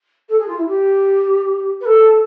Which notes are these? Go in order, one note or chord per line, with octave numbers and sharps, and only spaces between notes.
A4
G#4
F4
E4
G4
B4
A4